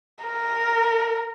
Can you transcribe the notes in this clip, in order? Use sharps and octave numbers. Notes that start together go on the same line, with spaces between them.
A#4